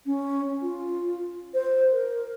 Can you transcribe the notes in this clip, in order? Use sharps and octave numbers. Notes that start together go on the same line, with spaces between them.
C#4
F4
C5
A#4